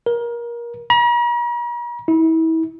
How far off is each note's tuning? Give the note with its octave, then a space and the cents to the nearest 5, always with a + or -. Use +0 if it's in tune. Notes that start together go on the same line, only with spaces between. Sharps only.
A#4 +25
A#5 +45
E4 -35